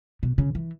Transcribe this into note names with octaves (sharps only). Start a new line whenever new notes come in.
B2
C#3
E3